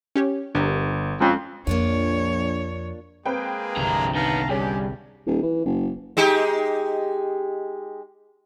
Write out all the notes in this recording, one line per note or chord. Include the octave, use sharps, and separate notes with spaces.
C#4 G4 C#5
G1 D4 G4 A#4
F2 G#3 C#4
A#1 F2 A#3 D4 F4 C#5
G#3 A#3 C4 G#4 B4 G5
G1 C2 F2 A#5
D#3 B3 F5 A5 A#5
G2 C#4 G4 G#4
D#1
E3
F#1
G#3 D#4 G4